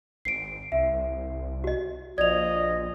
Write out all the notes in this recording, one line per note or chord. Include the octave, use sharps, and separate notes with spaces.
G#1 C7 D7
C2 E5
F#4 D#5
A#1 F3 D5 D#5 G#6 F7